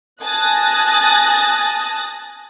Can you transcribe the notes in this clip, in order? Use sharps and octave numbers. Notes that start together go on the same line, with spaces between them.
G#5 A5 D#6 F#6 A6 A#6